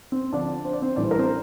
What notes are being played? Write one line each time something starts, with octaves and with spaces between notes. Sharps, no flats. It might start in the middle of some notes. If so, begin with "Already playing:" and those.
C4 C5
D3 F3 C4 D4 D5
C5
D5
C4 C5
A2 E3 G3 D4 D5
C5
A#4
C4 C5